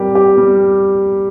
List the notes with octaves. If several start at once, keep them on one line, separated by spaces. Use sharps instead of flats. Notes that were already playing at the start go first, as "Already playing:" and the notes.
Already playing: G3 C4 G4 A#4
G4
G3